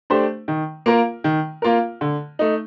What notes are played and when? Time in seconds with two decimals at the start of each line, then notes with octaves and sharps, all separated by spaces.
0.10 A3 D4 G4 C5
0.48 D#3
0.86 A#3 F4 A#4
1.24 D#3
1.62 A#3 F4 A#4
2.01 D3
2.39 A3 D#4